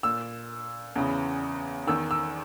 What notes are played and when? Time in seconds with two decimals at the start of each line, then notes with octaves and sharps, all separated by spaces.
0.03 A#2 E6
0.96 E2 C#3 E3
1.87 E2 D#3 E6
2.11 E6